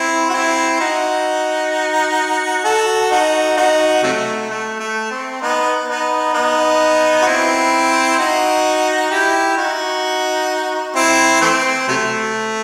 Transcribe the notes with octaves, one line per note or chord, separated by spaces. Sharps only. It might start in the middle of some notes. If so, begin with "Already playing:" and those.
Already playing: C4 E4
F#4
C4 E4
D#4 F#4
F#4 A4
D#4 F#4
D#4 F#4
C3 F#3 A3
A3
A3
C4
B3 D#4
B3 D#4
B3 D#4
F#4
C4 E4
D#4 F#4
E4 G4
D#4 F#4
C4 E4
E3 A3 C4
C3 F#3 A3